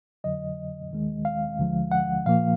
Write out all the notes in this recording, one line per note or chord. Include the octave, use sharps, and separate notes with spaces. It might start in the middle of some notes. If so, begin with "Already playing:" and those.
F2 D3 F#3 D#5
D#2 D#3 G#3
F5
D2 D3 F3 G#3
F#5
A#2 F3 A#3 F5